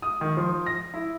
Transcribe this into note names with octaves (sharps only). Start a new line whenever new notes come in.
D#6
D#3
F3
A#6
E4